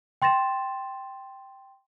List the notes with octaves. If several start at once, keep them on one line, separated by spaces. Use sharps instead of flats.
G5 C6 A6 A#6 E7